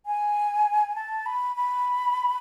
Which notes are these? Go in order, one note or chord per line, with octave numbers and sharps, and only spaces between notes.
G#5
A5
B5
B5